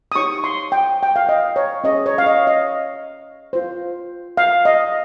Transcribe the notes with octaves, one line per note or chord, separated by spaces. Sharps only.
D#6
D#4 G4 C#5 C#6
C6
G5
G5
F5
D#5
C#5
C#4 G#4 C#5 D#5
C#5
F5
D#5
D#5
F4 C5
F5
D#5